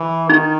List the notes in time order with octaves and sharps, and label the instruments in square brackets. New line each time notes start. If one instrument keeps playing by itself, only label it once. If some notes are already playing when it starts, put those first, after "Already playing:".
Already playing: [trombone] E3
[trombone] D#3 [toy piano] D#4